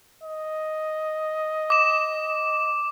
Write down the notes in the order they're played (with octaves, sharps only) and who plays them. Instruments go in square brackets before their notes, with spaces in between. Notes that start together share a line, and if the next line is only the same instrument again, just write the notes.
[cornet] D#5
[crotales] D6 E7